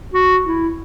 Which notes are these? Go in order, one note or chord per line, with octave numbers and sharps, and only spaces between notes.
F#4
E4